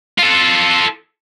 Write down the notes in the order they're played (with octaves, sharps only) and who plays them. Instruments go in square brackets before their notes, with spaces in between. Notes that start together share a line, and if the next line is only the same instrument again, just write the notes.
[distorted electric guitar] F4 A4